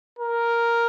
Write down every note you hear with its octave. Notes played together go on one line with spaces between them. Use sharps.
A#4